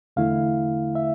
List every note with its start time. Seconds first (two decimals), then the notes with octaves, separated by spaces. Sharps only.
0.16 E2 D3 A3 E4 F5
0.95 E5